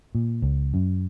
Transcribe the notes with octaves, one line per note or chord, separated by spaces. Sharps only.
A#2
C#2
F#2